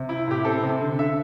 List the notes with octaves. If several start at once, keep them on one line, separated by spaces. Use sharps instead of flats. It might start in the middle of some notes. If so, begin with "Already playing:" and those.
Already playing: C3
E4
A2 G4
C4 A4
C3
D3
D3 E5